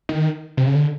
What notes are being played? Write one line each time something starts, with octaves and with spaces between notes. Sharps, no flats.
D#3
C3
C#3
D3